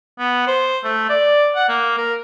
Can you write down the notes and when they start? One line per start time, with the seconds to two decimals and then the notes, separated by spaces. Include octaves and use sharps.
0.19 B3
0.47 C5
0.84 A3
1.09 D5
1.56 F#5
1.68 A#3
1.97 A#4